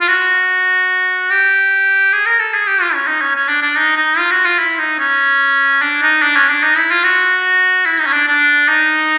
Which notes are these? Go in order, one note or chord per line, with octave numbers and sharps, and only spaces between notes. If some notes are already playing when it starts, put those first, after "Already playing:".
F4
F#4
G4
G#4
A#4
A4
G#4
G4
F4
C#4
D#4
C#4
C#4
D4
D4
D#4
D#4
F4
F#4
F4
E4
D#4
C#4
D4
D#4
D4
C#4
D4
D#4
E4
F4
F#4
E4
D#4
C#4
D4
D4
D#4